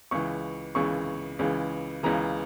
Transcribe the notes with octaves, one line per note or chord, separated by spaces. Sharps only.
C#2 C#3 E3 C#6
C#2 C#3 E3 C#6
C#2 C#3 E3
C#2 C#3 E3 A#5